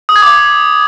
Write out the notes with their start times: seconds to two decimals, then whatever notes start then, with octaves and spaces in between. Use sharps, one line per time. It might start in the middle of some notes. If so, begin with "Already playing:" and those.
0.09 D#6
0.16 G#6
0.22 D6